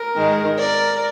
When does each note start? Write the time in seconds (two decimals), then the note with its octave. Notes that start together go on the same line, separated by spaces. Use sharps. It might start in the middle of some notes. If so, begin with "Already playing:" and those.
Already playing: A#4
0.16 G#2 D#3 G#3
0.57 A#4 D5